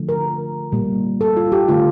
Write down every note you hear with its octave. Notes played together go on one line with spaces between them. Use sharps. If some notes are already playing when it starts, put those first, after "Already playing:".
Already playing: D3 F3 A3
A#4
A#2 G3 A#3
A4
F4
G4
D3 A3 F4